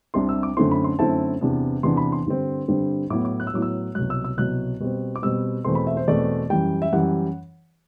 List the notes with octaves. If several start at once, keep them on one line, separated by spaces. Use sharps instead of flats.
C2 C3 G3 D4 C6
E6
D6
F#2 D3 A3 C4 E4 C6
B5
C6
F#2 D3 A3 C4 E4 A5
E2 C3 E3 B3 D4
E2 C3 E3 B3 D4 C6
B5
C6
G2 D3 G3 C4
G2 D3 G3 C4
A2 F#3 B3 E4 D6
D6
F#6
E6
A2 F#3 B3 E4 D6
E6
C2 B2 F#3 F#6
E6
E6
C2 B2 F#3 F#6
B2 G3 C4
D6
B2 G3 C4 E6
E2 B2 A3 C4 C6
B5
E5
C5
E2 B2 A3 C4 D5
F#2 E3 G3 G5
E5
F#2 E3 G3 F#5